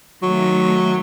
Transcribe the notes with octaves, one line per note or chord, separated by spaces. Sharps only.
D#3 F#3 A3